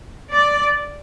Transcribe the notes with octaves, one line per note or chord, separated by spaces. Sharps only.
D5